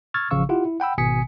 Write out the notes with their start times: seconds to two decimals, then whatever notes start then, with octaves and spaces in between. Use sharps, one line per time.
0.14 C#6 E6 F6 G#6 A6
0.31 A1 C#3 F3 F5 C#6 E6
0.49 E4 F4 G4 F#5
0.65 E4
0.80 F#5 G5 B5 E6
0.98 G#1 B2 G#5 D#6 B6 C#7